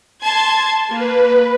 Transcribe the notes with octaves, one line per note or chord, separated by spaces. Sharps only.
A5 C6 G#6
A#3 B4